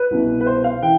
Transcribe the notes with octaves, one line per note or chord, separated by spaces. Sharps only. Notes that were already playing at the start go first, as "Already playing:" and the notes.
Already playing: B4
C2 B2
B4
C5
F5
E3 G5